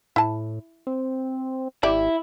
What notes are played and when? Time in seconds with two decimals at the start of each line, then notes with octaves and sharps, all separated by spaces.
0.16 A2 E4 A5
0.87 C4
1.83 G#1 E4 G4 D5